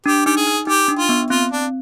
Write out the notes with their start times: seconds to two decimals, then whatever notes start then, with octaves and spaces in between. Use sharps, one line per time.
0.06 D4 G4
0.26 D#4 G4
0.37 G#4
0.47 D#4
0.67 D#4 G4
0.88 D4
0.99 F4
1.09 B3
1.30 C4 F4
1.51 D4